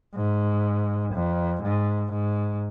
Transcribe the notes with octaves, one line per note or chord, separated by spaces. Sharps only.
G#2
F2
G#2
G#2